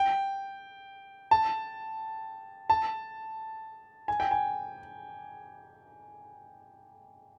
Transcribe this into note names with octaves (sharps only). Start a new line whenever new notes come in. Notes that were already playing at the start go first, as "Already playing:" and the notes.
Already playing: G5
A5
A5
G#5
G5
G#5